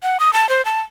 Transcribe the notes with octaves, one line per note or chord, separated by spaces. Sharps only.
F#5
D#6
A5
C5
A5